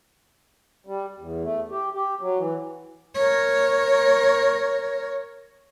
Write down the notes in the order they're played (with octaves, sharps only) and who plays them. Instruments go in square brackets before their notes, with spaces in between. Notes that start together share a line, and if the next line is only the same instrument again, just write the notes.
[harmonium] G3
E2
A3
G4
G4
F#3
E3
[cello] A#4 C#5